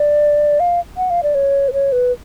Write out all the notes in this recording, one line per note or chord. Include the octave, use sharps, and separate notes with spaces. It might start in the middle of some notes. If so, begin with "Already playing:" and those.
Already playing: D5
F5
F#5
F5
D5
C#5
B4
C#5
B4